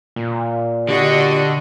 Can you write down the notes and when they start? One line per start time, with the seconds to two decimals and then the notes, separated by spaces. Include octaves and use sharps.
0.16 A#2
0.89 D3 F#4 G4 D#5